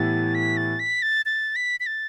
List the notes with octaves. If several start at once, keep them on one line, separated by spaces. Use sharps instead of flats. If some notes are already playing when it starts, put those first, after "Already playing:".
Already playing: A2 E3 B3 E4 G4 A6
B6
A6
B6
A6
A6
B6
B6
A6